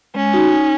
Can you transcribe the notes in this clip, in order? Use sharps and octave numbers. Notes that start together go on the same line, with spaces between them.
G#3 C#4
D#4 F#4
D#4